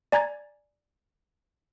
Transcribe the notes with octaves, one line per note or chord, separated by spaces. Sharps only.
D5 G#5 A#5 G#6 A6